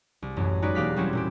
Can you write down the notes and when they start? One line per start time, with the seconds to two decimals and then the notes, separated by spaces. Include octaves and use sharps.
0.22 C2
0.36 A1 F#2
0.62 G#3 D#4 F#4 B4 D5
0.75 E1 A#3 G4 F5 F#6 B6
0.96 F#3 G3 C4 C#4 E4 F#4
1.13 A#2 E4 G4